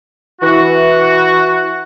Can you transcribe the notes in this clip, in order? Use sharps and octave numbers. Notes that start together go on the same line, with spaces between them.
E3 F#4